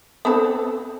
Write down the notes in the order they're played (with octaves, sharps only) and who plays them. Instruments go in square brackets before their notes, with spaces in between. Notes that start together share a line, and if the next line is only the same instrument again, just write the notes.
[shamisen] B3 C4 A4